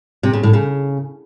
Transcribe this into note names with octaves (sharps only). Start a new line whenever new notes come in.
C3
C#3
A2
C#3